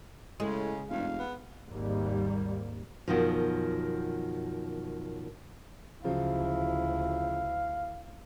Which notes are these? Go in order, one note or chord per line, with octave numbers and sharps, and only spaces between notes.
A2 C#3 G#3
F1 G2 F5
B3
G#1 D#2 G#2 G3 A#3
F#2 B2 D#3 F3
D2 C#3 F3 F#3 E4 F5